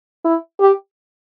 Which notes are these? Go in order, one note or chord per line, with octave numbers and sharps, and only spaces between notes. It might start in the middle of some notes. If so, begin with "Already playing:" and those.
E4
G4